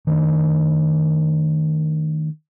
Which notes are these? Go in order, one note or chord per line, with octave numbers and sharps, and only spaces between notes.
D#3 A3 C4 D4